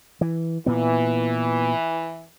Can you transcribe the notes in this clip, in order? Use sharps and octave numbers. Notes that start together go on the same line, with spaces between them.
E3
A#2 E3 B3